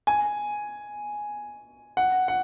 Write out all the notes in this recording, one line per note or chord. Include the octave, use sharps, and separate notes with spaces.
G#5
F#5
F#5